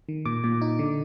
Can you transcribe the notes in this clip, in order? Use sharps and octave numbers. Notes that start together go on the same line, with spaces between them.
D#3
A#2 D6
A#2
D#4
D3